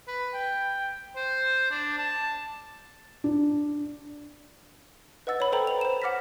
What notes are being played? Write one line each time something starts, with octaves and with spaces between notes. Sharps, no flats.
B4
G5
C5
D4
A5
D4
B4 D#5 F#5 E6 A6
C#5 B5
A4 B4 C5 G5 A#5 B5
F7
C5 E7
F#5 D6 F6 A#6 B6